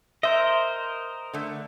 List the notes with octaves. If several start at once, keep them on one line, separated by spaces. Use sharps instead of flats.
A#4 C5 D#5 E5
D3 A3